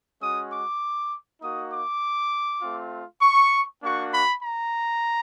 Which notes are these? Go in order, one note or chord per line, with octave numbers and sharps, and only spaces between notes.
G#3 C#4 F#4 D#6
D6
A#3 D#4 F#4 D#6
D6
A3 C4 F4
C#6
A#3 D4 F#4 C#6
B5
A#5